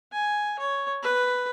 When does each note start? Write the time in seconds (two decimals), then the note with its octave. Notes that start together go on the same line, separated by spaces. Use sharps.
0.13 G#5
0.59 C#5
1.03 B4